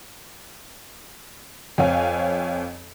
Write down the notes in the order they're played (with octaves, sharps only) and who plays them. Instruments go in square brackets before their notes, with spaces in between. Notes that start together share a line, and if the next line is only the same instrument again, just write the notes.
[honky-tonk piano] F2 C4 C#5 F5 G#5